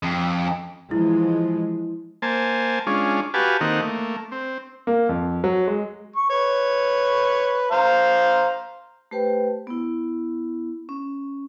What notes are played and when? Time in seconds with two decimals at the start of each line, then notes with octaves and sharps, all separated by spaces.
0.03 F2
0.91 E3 F3 G#3 E4
2.22 A#3 C5 G#5 A5
2.87 G#3 C#4 D4 F4
3.34 F#4 G4 B4 F5 G#5 A5
3.61 D#3 A#3 C4 D#4 A4 F#5
3.82 A3 A#3
4.32 C4
4.87 A#3
5.09 F2
5.44 F#3
5.68 G#3
6.16 C#6
6.30 B4 C#5
7.71 C5 F5 A#5
9.11 A3 G4 B4 C5 G5
9.67 B3 E4
10.89 C#4